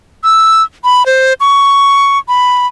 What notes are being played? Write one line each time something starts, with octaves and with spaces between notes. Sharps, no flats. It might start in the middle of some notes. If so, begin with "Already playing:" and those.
E6
B5
C5
C#6
B5